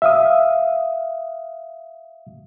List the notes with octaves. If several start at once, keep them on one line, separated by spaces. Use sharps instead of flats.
E5 F5 D#6